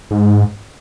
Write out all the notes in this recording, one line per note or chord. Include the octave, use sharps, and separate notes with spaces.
G#2